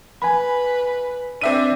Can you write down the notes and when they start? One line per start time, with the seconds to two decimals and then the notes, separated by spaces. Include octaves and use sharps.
0.22 B4 G#5 B5
1.41 C4 D4 E5 D#7